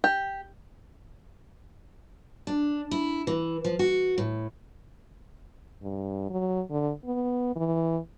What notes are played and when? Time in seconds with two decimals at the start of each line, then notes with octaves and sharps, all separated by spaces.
0.04 G4
2.47 D4
2.91 E4
3.27 E3
3.65 F3
3.79 F#4
4.18 A2
5.83 G2
6.30 F#3
6.71 D3
7.05 B3
7.56 E3